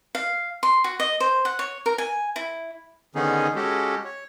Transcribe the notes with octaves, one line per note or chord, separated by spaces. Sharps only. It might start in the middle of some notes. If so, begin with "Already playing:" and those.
F5
C6
F#4
D#5
C5
F#5
C#5
A#4
G#5
E4
D3 D#3 B3 C#4 D#4 G#4
G#3 C#4 F#4 G4 A4
C#5